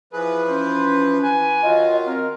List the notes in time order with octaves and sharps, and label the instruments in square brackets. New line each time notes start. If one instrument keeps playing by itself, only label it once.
[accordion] E3 F3 B4 [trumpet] G#4
[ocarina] C#4 [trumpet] C5
[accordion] E3 B4 [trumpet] G#5
[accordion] D#3 F#3 F4 [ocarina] D#5
[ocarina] C4 [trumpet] A#4